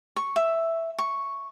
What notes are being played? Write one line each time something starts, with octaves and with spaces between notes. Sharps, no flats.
C#6
E5
C#6